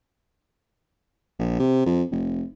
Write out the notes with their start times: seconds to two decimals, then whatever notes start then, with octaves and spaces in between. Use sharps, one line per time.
1.39 A#1
1.59 C3
1.86 F2
2.11 F1